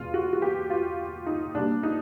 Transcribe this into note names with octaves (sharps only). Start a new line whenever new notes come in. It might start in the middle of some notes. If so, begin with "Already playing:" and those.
Already playing: E2 B2 G#3 F4
F#4
F#4
G4
F4
D#4
B2 G3 A#3 D4
D#4